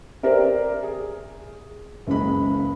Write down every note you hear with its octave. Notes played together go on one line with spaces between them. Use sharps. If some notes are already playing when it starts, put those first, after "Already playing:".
G4 A#4 C5 D5 E5
G#4
F#1 C#2 G#3 B5